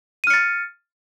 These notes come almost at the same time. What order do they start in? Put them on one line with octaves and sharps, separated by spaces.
D#7 F6 C#7 A6